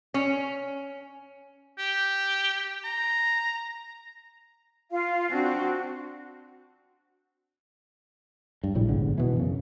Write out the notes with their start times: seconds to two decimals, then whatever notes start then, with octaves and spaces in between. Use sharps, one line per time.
0.14 C#4
1.78 G4
2.84 A#5
4.91 F4 F5
5.30 C4 D4 F#4
8.63 G2
8.75 A#1 A2 C3 G3
8.88 G1 G#2 D3
9.18 B2 E3
9.36 F#2 C#3